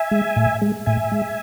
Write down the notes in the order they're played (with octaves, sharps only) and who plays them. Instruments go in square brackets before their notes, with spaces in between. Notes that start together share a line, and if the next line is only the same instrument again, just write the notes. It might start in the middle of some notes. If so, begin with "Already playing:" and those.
Already playing: [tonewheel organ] E5 G#5
G#3
A2
G#3
A2 E5 G#5
G#3